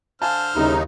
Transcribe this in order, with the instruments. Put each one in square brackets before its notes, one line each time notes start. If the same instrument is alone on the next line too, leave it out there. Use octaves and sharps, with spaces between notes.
[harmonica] D3 C5 F6 [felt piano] F5 G#5 A5
[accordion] D#2 D#4 [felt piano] C#3 G3 E4